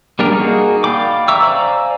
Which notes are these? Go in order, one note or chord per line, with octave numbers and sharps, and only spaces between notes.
G3 A#3 D4 G4 A#4
A#3 D#4 F#4 G#4
D5 F5 G5 B5 D6
E5 A#5 C#6 D6 E6
C5 D5 F5 G#5 A#5